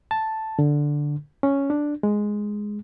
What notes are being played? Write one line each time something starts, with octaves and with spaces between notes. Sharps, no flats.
A5
D3
C#4
D4
G#3